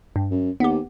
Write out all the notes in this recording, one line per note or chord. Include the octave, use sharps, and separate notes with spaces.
G2
F#2
D#2 B3 G4